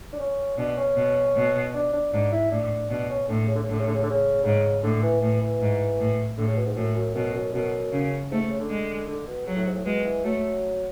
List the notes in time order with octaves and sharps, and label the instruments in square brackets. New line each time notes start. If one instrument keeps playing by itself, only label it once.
[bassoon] D4
C#4
[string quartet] B2 [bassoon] D4
[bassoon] C#4
[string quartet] B2
B2
[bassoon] D4
D4
[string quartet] G#2 [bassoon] D4
[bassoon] E4
[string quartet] A2 [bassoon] D4
[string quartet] B2 [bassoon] D4
[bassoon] C#4
[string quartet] A2 [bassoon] D3
[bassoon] C#3
D3
C#3
[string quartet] A2 [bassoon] D3
[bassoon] C#3
D3
C#3
D3
C#3
[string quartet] G#2 [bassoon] C#3
[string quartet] A2 [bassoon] D3
[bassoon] E3
[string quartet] A2 [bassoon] E3
[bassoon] E3
[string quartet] G#2
A2
[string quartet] A2 [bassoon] D3
[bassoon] C#3
B2
G#2
[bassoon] F#2 [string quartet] A2
[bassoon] F#2
[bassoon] F#2 [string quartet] B2
[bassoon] F#2
[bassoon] F#2 [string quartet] B2
[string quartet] C#3
[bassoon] G#2 [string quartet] A3
[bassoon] C#3
D3
[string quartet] G#3
[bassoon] D3
B2
[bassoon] C#3 [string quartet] F#3
[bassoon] A2
G#2
A2
[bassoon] B2 [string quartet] G#3
[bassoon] E3
[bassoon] F#3 [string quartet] A3